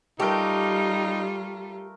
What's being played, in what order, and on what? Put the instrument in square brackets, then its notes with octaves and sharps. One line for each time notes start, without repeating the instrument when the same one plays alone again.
[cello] G3 F4 [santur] A3 A#4 [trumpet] D#4 [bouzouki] G4